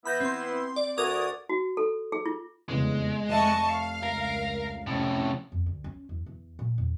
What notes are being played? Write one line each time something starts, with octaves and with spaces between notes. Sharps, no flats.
E3 B3 E4 B5 G6 A#6
C4 C6
D5
D2 F#4 A#4 D5 D#6 G#6
F#4
A4
G#4
F4
F1 E2 C#3 G#3
F1 D#5 E5 A5 C#6
F5
C#2 A#4
F2 A2 C3 C#4
F2
D2
C#4
E2
E2
A#2
E2